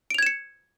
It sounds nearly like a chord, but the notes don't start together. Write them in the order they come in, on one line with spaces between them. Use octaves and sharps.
D7 F7 G#6 E7 C#7